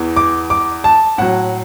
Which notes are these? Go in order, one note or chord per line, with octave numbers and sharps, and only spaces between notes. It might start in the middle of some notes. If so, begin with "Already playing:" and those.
Already playing: E2 E3
D6
D6
A5
A2 F#3 F#5